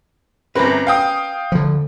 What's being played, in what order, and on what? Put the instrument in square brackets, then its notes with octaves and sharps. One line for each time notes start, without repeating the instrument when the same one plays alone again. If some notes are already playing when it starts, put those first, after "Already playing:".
[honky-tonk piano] G1 C4 [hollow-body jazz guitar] C#4 A#4 B4
[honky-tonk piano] F5 G5 D#6
[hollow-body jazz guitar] D2 [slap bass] D3 F3